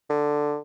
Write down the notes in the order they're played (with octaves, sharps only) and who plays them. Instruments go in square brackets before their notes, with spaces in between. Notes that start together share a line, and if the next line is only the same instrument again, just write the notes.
[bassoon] D3